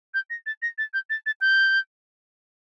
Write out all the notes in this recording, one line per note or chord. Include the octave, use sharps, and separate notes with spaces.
G6
A#6
A6
A#6
A6
G6
A6
A6
G6